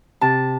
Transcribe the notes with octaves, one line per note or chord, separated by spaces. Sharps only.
C3 A5